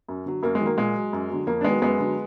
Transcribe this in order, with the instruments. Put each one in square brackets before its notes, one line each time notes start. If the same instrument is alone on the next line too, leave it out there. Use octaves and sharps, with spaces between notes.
[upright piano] F#2
D3 F#3
F#2 A#3
G#3
D#3 F#3
A#3
A#2 G#3
F#3
F#2
D3 F#3
F2 A#3
D4
D#3 F#3 G#3 B3
F#2 G#3 B3
D3 F#3